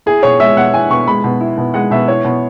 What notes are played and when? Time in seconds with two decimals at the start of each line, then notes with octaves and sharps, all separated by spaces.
0.06 E4 G#4
0.23 B2 C#5
0.40 G#3 E5
0.57 B2 F#5
0.74 E4 G#5
0.90 B2 C#6
1.07 G#3 B5
1.24 B2
1.41 E4
1.58 B2
1.74 G#3 F#5
1.91 B2 E5
2.08 E4 C#5
2.25 B2